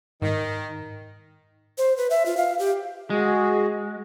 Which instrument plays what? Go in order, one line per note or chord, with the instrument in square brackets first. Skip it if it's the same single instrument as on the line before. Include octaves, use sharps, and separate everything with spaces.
[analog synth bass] G#2 [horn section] D#3
[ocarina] C5
B4
E5
F4
F5
G4
[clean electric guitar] G#3 [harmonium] F#4 G#4